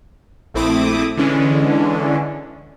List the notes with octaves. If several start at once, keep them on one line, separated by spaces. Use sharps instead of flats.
A#1 A3 C4 E4 D6 D#6
D3 E3 G#3 C#4 D4